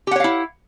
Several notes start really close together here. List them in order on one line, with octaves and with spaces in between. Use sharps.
G4 F#5 C#5 F5 E4